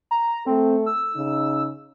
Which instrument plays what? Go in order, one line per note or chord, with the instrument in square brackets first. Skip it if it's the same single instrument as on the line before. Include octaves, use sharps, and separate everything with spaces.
[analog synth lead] A#5
[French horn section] A3 A4 [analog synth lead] C4
[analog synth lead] E6
[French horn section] C#3 D#4